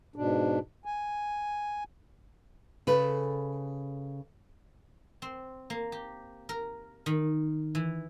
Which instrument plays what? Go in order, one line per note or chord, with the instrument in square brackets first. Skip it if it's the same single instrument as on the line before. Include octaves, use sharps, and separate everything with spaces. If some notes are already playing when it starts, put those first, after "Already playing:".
[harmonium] G#2 B2 D4
G#5
[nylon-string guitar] C#3 A4 B4
[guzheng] C4
A#3
G4
A#4
D#3
E3